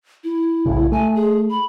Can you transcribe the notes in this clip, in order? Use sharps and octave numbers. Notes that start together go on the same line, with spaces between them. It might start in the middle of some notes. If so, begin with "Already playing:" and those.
E4
B1 A2 C#3
A3 G#5
G#4
B5